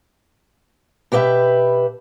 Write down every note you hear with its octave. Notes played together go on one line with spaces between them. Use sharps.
B2 G4 B4 D#5 E5